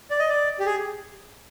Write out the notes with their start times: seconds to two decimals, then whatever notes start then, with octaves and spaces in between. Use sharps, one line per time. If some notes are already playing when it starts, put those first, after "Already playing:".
0.10 D5
0.19 D#5
0.29 D5
0.59 G4
0.66 G#4